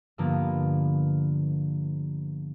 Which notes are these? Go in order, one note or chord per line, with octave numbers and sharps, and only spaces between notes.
G2 D3 F3 A#3 B3